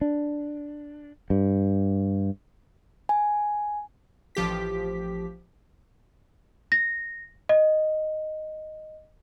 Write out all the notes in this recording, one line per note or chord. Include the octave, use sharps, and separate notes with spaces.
D4
G2
G#5
A1 F3 G4 B6
A#6
D#5